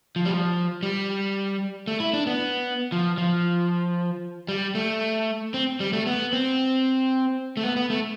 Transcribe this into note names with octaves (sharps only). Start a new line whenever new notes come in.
F3
G3
F3
G3
A3
E4
D4
B3
F3
F3
G3
A3
C4
G3
A3
B3
C4
A3
B3
B3
A3